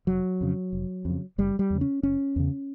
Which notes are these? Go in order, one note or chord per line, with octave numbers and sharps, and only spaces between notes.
F1 F#3
F2 C#3
F1
F2 C#3
F#1 G3
G3
E2 C#3
C#4
F#1 C#4
E2 C#3